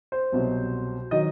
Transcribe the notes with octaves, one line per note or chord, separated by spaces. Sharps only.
C5
C2 B2 F#3
D#3 F#3 D#5